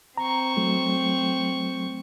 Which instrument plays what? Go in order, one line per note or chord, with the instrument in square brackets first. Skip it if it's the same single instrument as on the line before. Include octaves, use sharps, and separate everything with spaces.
[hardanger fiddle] C4 C#6 [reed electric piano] A#5
[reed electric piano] F#3 A3